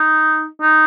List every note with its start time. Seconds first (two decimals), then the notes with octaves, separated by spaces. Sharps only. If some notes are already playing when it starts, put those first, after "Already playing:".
Already playing: D#4
0.61 D#4